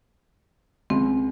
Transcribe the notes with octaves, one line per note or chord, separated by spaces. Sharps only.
C#2 C4